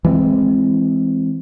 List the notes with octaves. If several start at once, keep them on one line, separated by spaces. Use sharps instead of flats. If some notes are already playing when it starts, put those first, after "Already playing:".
E3 G#3 A#3 C4